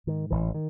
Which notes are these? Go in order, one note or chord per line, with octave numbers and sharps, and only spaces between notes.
G#2 D#3
A1 E3
D#3